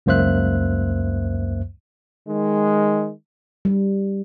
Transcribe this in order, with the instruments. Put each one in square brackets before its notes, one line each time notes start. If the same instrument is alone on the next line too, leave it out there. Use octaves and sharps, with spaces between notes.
[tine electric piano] C#2 F#2 A#3 C5 E5 F#6
[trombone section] D#3 G#3
[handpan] G3